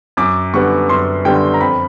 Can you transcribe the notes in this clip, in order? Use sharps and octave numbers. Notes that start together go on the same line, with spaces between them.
F#2 D6
D3 G3 B3 C#6
F#2 C6
D3 G3 B3 G5
A#5
F2 B5